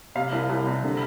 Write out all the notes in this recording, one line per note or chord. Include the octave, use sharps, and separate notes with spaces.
C3 F5
C2
C2
C3
D3